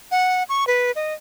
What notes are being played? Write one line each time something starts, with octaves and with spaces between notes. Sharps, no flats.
F#5
C#6
B4
D#5